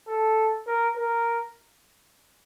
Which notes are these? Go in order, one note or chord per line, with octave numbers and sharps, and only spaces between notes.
A4
A#4
A#4